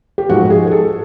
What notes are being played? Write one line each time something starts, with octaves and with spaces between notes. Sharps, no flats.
G4
G#2 F3 F#4
G4
G#4
G#4
A4